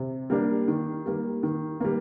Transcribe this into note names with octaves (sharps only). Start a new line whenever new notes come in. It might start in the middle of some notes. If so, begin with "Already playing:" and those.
Already playing: C3
G3 A#3 D4
D#3
G3 A#3
D#3
G3 A#3